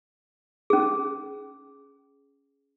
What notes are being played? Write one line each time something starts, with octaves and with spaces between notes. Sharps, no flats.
C#4 G#4